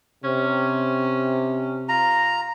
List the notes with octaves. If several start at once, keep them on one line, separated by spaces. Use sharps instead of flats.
C3 C#4
F4 A#5